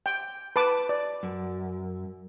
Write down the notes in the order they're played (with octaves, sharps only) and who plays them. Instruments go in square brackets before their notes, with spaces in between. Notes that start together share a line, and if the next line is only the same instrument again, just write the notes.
[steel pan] G5
B4 A5 D6
D5
[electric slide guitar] F#2